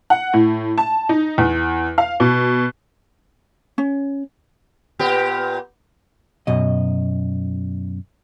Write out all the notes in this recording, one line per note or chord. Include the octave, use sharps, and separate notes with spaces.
F#5
A2
A5
D#4
E2
F5
B2
C#4
A#2 B3 G4
F#2 B2 D#5